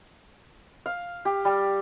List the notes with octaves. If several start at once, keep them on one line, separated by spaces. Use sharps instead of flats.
F5
G4
G3